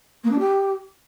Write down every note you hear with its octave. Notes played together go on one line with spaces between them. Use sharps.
A#3
D4
G4